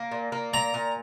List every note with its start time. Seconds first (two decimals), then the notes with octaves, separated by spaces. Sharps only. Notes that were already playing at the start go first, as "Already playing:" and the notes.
Already playing: A#3
0.11 A#2
0.32 A#3
0.53 A#2 A#5
0.74 A#2